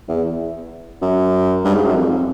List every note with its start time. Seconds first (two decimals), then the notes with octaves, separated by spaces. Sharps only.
0.08 E2
1.02 F#2
1.64 G2
1.75 G#2
1.85 F#2
1.95 F2